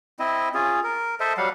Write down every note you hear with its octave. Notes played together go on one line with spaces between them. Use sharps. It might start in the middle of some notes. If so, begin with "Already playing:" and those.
C4 E4 D#5
C#4 F4 G#4
A#4
A4 C5 D#5 E5
F#3 G3 F5 F#5